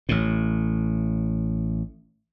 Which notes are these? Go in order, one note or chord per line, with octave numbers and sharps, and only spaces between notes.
A1 A2